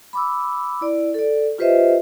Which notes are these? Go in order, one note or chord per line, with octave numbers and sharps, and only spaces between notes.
B5 D6 E6
E4 D5
A4 D5
F4 G4 B4 C5 D#5 E5